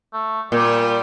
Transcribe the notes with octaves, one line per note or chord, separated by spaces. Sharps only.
A3
A#2 G3